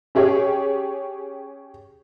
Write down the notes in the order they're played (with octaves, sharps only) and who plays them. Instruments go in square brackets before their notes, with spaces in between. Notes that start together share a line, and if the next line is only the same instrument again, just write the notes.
[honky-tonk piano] C#4 G4 G#4 C#5